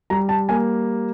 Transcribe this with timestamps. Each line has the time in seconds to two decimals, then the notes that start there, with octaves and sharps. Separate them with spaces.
0.10 G3 A#5
0.29 A5
0.49 A#3 G#5